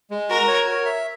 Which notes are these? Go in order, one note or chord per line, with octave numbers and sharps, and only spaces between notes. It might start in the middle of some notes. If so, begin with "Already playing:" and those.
G#3
F#4 A#4
C#5
A#4
E5